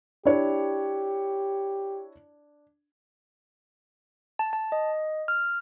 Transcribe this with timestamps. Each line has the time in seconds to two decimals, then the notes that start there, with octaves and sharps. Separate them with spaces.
0.25 D4 E4 G4 C#5
4.39 A5
4.53 A5
4.72 D#5
5.28 F6